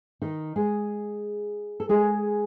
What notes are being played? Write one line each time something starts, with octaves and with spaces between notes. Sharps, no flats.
D#3 D#4
G#3 G#4
A4
G#3 G#4